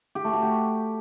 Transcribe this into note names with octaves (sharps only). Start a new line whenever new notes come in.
G4
A3
F#4
G4